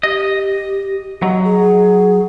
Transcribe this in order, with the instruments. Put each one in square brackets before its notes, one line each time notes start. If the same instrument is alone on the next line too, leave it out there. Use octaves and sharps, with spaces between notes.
[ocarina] G4 [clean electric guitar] D#5
[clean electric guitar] F#3 [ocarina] D#5
[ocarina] G#4